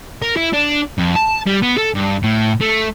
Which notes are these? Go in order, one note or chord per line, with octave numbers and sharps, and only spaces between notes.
A#4
E4
D4
F2
A5
G3
B3
A4
G2
A2
A3